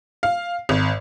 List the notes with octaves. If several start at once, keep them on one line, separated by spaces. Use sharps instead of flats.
F5
G#1